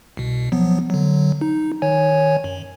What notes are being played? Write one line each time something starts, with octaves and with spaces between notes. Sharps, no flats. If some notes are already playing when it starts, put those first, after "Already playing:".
C2 B2
F3 F#3 B3
D3 F#3
D#4
D#3 C#5 G#5
F#2